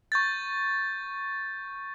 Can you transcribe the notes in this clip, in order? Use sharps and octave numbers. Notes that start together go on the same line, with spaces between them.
C#6 G6 A6